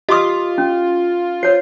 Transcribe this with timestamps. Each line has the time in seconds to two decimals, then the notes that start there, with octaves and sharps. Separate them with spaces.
0.09 F4 G4 D#5 C6 D6 D#6
0.58 C#4
1.43 C5 C#5 C7